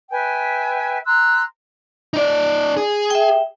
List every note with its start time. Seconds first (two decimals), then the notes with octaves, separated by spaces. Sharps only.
0.10 B4 E5 G5 G#5
1.05 A#5 C6 E6 F#6
2.14 D#4 D5
2.77 G#4
3.10 E5 G5